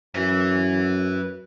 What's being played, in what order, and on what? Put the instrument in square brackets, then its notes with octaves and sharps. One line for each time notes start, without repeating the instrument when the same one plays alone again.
[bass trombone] F#2 [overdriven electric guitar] B4 E5